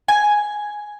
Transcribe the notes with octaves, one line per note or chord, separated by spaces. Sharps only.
G#5